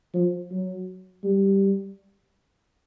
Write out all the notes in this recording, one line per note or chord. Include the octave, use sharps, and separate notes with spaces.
F3
F#3
G3